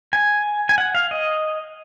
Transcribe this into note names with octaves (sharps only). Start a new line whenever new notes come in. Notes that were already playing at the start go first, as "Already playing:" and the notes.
G#5
G#5
F#5
F5
D#5